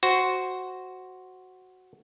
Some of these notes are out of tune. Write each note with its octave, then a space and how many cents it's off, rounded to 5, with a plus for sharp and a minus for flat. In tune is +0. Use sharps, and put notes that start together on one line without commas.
F#4 +0 C5 +0